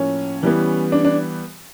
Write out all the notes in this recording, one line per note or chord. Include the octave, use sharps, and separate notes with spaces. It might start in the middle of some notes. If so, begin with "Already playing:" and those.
Already playing: A2 F3 A#3 C#4
E3 G3 B3
D4
D4